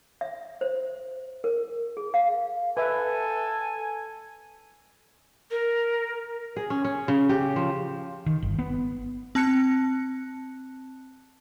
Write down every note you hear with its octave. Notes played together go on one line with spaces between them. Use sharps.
E5
C5
A#4
G#4
F5
A4 B4 E5 G#5
A#4
G#4
C#4
C#4
C#3
G4
F3
D#3
G1
B3
C4 A5 F#6 C#7